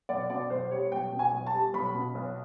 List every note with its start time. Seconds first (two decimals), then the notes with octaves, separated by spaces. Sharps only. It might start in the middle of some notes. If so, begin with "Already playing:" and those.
0.09 B1 D5
0.30 B2 D5
0.50 B1 C5
0.71 G3 C#5
0.92 B1 G5
1.12 B2
1.19 G#5
1.32 B1
1.47 A5
1.53 G3
1.74 B1 B5
1.94 B2
2.15 B1